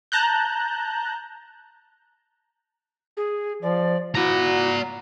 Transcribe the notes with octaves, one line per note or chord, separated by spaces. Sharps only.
A5 A#5 F#6 G6
G#4
F3 D5
E4 F#4 D5 A#5